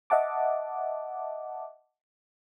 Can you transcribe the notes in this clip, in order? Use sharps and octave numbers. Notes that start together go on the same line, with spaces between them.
D#5 E5 F#5 A5 D6